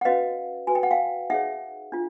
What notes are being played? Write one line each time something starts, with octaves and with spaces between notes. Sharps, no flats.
F#5
C#4 F#4 B4 D#5 F5
F#4 B4 G#5
G5
F#5
F5 G5
D#4 G#4 C#5 E5 F#5
D4 F4